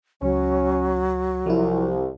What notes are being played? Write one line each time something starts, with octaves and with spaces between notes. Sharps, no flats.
C#2 F#3 C#4
C2 F3 E4